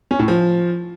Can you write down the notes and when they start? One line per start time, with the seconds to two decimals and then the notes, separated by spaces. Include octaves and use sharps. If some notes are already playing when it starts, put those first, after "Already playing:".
0.11 C#4
0.19 A2
0.28 F3